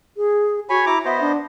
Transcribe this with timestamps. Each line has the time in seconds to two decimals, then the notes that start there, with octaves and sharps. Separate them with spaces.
0.17 G#4
0.69 F#4 C#5 G#5 B5
0.86 E4 A#5 D6
1.05 B3 C5 D#5 E5
1.21 D4